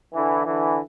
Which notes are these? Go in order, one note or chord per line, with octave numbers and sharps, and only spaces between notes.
D3 E3
D3 E3